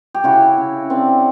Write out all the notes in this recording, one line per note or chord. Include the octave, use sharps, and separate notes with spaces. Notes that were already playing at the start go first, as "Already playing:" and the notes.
G4
C#3 E4 F#4
C#3
C#3 C4 D4